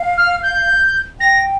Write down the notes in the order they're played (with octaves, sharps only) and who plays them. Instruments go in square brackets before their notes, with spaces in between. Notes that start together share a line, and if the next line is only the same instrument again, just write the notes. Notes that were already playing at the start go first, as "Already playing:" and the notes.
Already playing: [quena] F5
[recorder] F6
G6
[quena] G5 [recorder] A#6